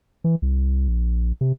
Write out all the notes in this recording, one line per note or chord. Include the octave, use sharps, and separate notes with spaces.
E3
C2
A#1
C3